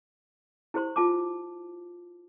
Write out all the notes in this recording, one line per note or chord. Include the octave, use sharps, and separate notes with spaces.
E4 G4 C5 C6
F4 A5 D6